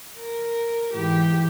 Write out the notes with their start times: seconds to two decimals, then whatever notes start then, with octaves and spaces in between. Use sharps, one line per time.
0.18 A#4
0.94 G#2 E3 G4